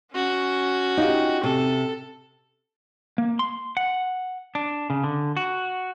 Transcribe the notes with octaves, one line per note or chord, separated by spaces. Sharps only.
C#4 F#4
D#4 F4 G4
C3 A4
A#3
C6
F#5
D4
C#3
D3
F#4